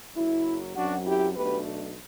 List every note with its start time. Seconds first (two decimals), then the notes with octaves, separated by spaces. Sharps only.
0.16 F#1 F#2 F#3 E4
0.76 F#2 F#3 C4 D4 F#4
1.06 E4 G4
1.36 B1 B2 A3 D4 G4 B4